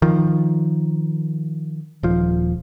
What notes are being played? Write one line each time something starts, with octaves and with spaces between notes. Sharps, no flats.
D#3 F3
D#1 F3